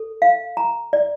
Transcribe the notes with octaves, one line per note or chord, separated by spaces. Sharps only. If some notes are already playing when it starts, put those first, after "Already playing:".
Already playing: A4
F5
A#5
D5